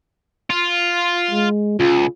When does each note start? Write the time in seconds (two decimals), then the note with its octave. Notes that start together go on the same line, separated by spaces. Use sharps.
0.50 F4
1.31 G#3
1.80 C#2 F4